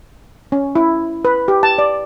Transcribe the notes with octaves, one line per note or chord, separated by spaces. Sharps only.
C#4
E4
B4
G4
A5
D5